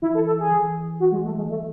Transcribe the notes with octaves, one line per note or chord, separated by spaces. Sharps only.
E3 E4
A4
A4
G#4
E3
F#4
G#3
A3
G#3
E3 A3